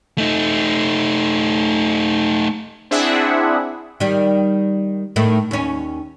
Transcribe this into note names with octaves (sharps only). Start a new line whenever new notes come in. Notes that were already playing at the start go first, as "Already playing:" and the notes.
A3 D#4
C4 D4 E4 G#4 E5 F#5
D#3 G3
A2 D#3 A3
D#2 C#4